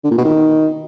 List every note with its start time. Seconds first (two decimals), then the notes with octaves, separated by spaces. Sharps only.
0.04 D3
0.11 A#2
0.18 B2
0.24 D#3